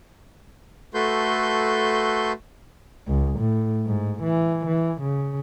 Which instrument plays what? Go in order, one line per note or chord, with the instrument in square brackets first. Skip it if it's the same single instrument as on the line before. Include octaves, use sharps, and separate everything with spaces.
[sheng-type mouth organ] A3 F#4 A4 B4 C6 G6
[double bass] C#2
A2
G#2
E3
E3
C#3